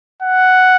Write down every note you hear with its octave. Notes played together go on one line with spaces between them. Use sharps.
F#5